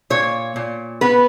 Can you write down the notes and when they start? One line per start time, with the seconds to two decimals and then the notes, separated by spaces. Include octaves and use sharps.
0.10 A#2 C#5
0.56 A#2
1.01 B3 B4